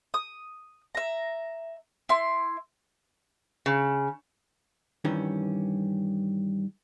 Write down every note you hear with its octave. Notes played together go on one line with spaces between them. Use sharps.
D#6
E5 A#5
E4 C6
C#3
G2 D#3 E3 G3 C#4